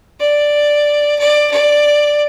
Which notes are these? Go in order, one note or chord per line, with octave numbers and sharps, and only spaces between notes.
D5
D5
D5